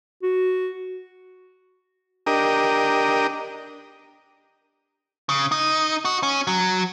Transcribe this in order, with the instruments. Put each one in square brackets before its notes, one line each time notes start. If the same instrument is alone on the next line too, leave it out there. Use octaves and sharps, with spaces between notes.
[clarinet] F#4
[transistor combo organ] D4 G4 A#4 D#5
[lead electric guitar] C#3
D#4
F#4
C#4
F#3